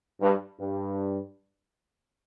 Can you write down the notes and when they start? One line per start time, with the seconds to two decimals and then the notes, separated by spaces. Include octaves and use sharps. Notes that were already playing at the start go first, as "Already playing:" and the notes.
0.21 G2
0.60 G2